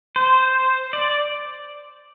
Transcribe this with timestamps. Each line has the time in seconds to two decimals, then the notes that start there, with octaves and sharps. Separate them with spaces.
0.16 C5
0.93 D5